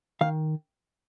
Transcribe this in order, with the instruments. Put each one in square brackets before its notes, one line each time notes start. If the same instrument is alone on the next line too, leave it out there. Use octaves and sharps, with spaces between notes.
[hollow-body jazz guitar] D#3 F5